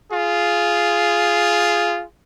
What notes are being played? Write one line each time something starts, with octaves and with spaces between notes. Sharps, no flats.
F4 G#4